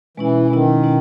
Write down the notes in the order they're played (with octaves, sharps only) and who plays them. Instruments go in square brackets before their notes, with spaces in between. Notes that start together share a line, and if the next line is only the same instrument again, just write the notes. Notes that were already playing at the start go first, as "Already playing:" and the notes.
[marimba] B2 G#3 C#4 E4 [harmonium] E3
[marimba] B2 G#3 C#4 E4 [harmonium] D#3
[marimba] B2 G#3 C#4 E4